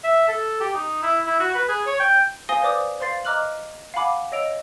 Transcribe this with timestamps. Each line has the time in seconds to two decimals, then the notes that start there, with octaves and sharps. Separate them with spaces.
0.04 E5
0.28 A4
0.61 G4
0.74 D#4
1.03 E4
1.26 E4
1.40 F#4
1.55 B4
1.69 G#4
1.86 C#5
2.00 G5
2.49 C5 F5 G#5 D#6 A#6 G7
2.61 B4 C5 D5 D6 D#6
3.00 C5 F5 C6 A6 C7
3.25 D#5 A#5 D6 F6 F#6 F#7
3.94 F5 F#5 G#5 B5 D6
4.32 C#5 D#5 E6 D7 F7